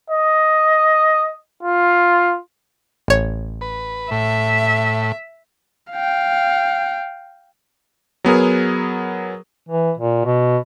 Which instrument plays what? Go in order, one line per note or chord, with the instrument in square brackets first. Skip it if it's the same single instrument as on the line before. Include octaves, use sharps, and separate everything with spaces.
[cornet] D#5
F4
[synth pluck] A1 C#5
[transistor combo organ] B4
[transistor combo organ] A2 [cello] E5
[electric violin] F5 G5
[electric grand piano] F#3 B3 G#4 A#4
[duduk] E3
A#2
B2